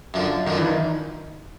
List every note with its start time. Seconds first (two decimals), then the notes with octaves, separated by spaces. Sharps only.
0.14 F#2 D3 F3
0.46 F#2 D3 D#3 F3 D#4
0.56 E3 E4
0.67 D#3 D#4